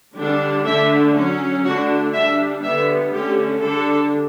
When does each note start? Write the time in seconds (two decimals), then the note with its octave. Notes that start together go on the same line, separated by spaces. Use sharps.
0.16 D3 G3 D4
0.65 D3 A3 D4 E5
1.15 F#3 C#4
1.64 D3 A3 D4 F#4
2.14 G3 D4 E5
2.64 D3 G3 B3 E5
3.13 D3 A3 C#4 G4
3.63 D3 G3 D4 A4